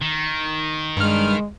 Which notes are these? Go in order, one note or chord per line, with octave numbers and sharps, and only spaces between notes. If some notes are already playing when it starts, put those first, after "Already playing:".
D#3
G2 G#3 F6